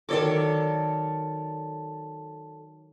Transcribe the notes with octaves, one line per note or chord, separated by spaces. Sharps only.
D#3 F#3 A4 C#5 D5 D6